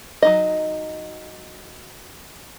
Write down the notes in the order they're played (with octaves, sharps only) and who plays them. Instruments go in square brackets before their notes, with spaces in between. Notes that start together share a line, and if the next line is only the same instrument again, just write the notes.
[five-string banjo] F#3 D#4 D#5